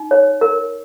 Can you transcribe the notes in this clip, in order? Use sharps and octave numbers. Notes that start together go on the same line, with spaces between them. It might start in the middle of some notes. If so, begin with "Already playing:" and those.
Already playing: D#4
C#5
A#4